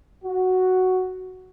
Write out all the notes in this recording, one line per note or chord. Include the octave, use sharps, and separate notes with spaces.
F#4